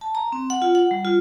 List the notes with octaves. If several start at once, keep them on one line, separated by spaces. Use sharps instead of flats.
A5
A#5
C4
F#5
F4
F#5
G3
F4